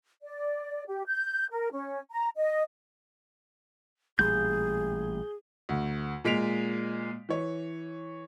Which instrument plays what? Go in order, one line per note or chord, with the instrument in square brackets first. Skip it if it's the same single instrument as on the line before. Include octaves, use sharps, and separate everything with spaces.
[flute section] D5
G4
G6
A#4
C#4
A#5
D#5
[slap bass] A1 A#2 G3 [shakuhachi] G#4 [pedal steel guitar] G6
[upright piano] D2
A#2 G#3 B6 D7 F7
E3 C#5